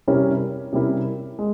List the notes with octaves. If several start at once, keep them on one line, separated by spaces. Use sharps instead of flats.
C3 G3 C#4 E4 A#4
C3 G3 C#4 E4 A#4
G#3